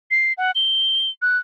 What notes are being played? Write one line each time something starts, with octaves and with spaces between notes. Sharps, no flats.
C7
F#5
G7
F#6